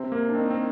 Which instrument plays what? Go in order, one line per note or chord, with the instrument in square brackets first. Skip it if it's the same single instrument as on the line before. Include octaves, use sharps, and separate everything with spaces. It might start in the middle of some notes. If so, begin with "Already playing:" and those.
Already playing: [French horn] C3 [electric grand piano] C4
[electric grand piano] A#3
D4
[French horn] D#3 [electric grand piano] C4
[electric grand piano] C4